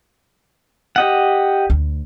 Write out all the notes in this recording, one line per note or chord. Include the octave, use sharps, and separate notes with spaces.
G4 D#5 F#5
D2